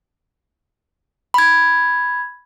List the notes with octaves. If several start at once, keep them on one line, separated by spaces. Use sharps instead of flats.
B5 G#6